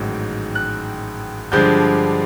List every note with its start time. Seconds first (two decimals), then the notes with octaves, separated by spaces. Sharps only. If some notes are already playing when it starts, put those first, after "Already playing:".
Already playing: A1 G#2 D#3 F#3
0.55 F#6
1.52 G2 D3 F3 G#3 G6